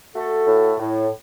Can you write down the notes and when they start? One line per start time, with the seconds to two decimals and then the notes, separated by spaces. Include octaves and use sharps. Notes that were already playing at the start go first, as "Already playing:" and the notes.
0.14 A3 F#4 A4
0.47 A2
0.79 A2